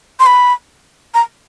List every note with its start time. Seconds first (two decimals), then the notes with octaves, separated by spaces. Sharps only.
0.20 C6
0.26 B5
1.14 A#5